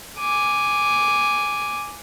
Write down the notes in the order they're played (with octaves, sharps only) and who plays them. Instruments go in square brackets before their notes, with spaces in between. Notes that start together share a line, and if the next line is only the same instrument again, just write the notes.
[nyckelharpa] G#5 D6